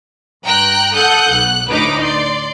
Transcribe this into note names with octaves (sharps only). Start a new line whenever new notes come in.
G2 G5 A#5 F#6
A4 F#5 D#6 F#6 G6
B1 F#6
D2 A2 D#4 B4 D6
D5 C6